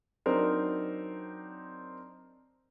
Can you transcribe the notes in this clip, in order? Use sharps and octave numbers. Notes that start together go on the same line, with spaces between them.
F#3 C4 D4 D#4 A#4 C5